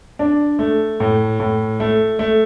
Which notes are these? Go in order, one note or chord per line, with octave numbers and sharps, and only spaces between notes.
D4
A3
A2
A2
A3
A3